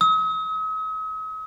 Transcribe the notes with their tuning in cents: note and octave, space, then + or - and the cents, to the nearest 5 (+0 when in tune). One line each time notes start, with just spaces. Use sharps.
D#6 +45